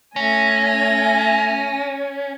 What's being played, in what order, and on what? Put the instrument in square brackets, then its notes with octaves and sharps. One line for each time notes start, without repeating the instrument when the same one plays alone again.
[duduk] A3 [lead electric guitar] C#4 [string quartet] G#5 A#6